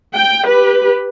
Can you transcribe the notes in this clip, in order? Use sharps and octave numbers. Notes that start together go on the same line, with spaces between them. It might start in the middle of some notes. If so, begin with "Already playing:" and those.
G5
G4 B4